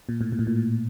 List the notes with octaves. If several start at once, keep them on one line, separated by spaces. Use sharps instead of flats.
A#2
A2
A#2
A2
A#2